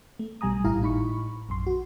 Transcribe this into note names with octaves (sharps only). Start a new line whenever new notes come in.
A3
B1 B2 G3 G#5 A#5 D#6
G#1 A2 E4 G4 F5 A#5
A2 D#4 B5 C#6
A#1 F#2 C6
F#4